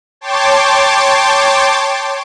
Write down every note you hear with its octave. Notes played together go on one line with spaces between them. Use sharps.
C#5 G5 A5 C6 D6